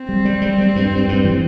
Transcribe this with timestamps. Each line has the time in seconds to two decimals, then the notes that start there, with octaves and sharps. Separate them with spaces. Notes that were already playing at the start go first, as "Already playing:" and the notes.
Already playing: C4
0.09 G3
0.25 G3
0.42 G3
0.58 G3
0.76 G2
0.92 G2
1.08 G2
1.25 E3